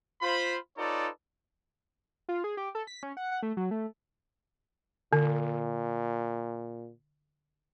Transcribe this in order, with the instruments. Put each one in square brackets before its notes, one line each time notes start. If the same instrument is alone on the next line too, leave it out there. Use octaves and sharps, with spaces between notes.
[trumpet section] F4 C5 B5
D#4 F4 A4 B4 C#5 D5
[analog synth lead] F4
G#4
G4
A4
B6
C#4
F#5
F#5
A3
F#3
A3
[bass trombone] A#2 [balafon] D3